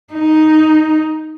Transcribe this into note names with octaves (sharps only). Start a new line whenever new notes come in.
D#4